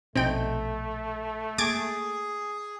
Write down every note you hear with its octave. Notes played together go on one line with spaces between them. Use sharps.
A#1 B2 A3 C4 D#4 G5
A#3 G#4 D6 G#6 A6